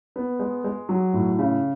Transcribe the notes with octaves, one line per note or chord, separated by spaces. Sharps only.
B3
G#3
G#3
F#3
A2
C#3